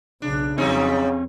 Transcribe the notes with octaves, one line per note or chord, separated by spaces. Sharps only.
B1 C#3 D4
F2 C#3 F#3 G3 C4 D#4 C#5